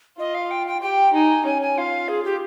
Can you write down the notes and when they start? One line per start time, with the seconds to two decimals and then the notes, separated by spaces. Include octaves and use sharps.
0.18 F4 D#5
0.35 F5
0.51 G5
0.67 G5
0.82 G4 G5
1.13 D#4 G#5
1.45 C#4 G#5
1.62 G#5
1.77 F4 F5
2.08 G#4
2.25 G4